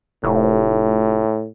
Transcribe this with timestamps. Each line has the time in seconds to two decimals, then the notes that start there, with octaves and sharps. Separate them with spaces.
0.24 F1 A2